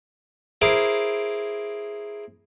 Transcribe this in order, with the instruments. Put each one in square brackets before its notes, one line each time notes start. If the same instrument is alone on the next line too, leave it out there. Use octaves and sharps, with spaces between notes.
[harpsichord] E4 G#4 A#4 C5 D6